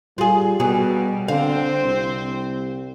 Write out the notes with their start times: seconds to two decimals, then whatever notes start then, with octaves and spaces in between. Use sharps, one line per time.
0.18 G3 F4 G#4
0.60 B2 F#3 G3 G#4
1.28 D3 C4 C5 F5
1.83 C2